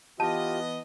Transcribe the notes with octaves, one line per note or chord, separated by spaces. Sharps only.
E3 B3 F4 G4 D#5 A5